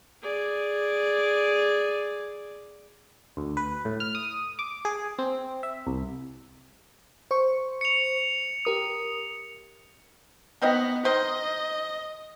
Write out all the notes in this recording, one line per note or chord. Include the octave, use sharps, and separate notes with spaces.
G#4 D5
D2
B4
A2
F6
D#6
D6
G#4
C4
E5
C2
C5 C#6
C#7 F7
G4 A#4 D#6
D#3 B3 C4 D#5
D#3 C5 D#5